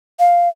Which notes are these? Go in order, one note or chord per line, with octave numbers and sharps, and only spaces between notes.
F5